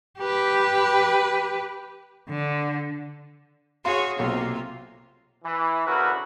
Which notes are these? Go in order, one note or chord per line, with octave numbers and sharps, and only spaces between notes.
G4 B4
D3
F#4 G#4 C#5 F5 C6
B1 C3 A#3 F4
E3
D2 C#3 E4 F#4 A#4 B4